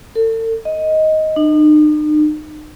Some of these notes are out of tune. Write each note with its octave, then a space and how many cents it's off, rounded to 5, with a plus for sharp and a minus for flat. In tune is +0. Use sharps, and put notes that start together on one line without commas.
A4 +40
D#5 +10
D#4 -45